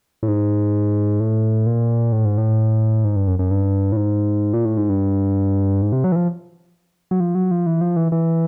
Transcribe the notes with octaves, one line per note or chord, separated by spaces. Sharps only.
A2
G#2
A2
A#2
A2
G#2
A2
G#2
G2
F#2
F#2
G2
A2
G#2
A#2
A2
G#2
G2
G#2
C3
F#3
E3
F3
F#3
F3
F#3
F3
E3
F3
E3
E3